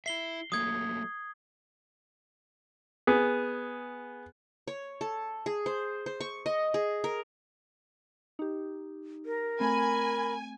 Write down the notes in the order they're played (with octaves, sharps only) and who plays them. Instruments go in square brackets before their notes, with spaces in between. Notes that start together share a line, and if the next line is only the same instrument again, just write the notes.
[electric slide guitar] E4 E5 [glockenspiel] C7 G7
[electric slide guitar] F#3 A3 A#3 [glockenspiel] D#6 G#6
[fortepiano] B3 G#4
[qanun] C#5
A4
G#4
C5
C5
C#6
D#5
G#4
A#4
[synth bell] D#4 G4
[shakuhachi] A#4
[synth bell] A3 C4 [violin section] G#5 [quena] B5